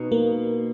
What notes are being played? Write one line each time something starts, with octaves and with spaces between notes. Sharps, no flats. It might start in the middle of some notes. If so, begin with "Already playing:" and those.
Already playing: B2 D#4
A#3